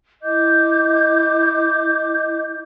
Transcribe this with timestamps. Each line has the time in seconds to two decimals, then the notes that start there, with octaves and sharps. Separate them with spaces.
0.22 E4 D#5 D6 G6